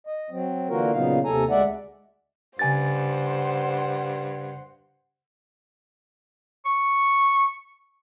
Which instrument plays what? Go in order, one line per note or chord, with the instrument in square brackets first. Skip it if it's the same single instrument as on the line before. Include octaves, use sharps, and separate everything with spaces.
[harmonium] D#5
F#3 C4
D3 E3 A#3 F4 F#4 A#4
A#2 C#3 F#3 B3 D#4 F5
D#2 C3 A4 G#5 A#5
D2 G#3 D5 E5 F#5
[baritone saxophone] G2 [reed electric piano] C#3 G#5 A6 [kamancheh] C5 F#5
[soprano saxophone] C#6